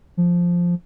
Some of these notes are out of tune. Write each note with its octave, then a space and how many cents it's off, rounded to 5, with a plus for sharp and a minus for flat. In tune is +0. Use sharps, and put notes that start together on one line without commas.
F3 +0